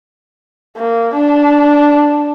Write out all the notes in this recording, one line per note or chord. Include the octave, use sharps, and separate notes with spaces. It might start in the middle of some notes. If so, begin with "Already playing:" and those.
A#3
D4